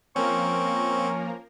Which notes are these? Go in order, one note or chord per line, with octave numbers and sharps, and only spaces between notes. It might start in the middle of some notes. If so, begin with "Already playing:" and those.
F3 A#3 C4 C#4 A#4 C#6